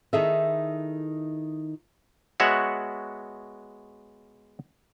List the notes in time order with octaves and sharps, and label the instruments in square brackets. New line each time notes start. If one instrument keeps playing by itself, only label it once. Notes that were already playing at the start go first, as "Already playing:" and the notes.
[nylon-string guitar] D#3 D#4 E4 G#4 A4 E5
[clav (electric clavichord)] G#3 B3 F#4 C#5 E5 F#5